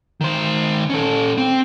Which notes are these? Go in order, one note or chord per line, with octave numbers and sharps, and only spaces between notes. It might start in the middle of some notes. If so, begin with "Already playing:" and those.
D#3 C5
C#4 A4
C4